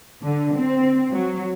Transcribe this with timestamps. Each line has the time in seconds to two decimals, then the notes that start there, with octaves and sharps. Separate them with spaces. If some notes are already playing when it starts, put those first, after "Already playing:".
0.23 D3
0.55 C4
1.12 F#3